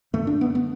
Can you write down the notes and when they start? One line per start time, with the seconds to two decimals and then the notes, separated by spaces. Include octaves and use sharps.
0.13 F#2 D3 A3
0.27 D4
0.41 B3
0.55 B3